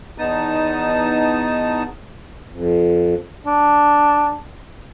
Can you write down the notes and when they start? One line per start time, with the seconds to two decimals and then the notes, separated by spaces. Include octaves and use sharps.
0.18 E2 B3 D#4 A5 D#6
2.50 F2
3.46 D4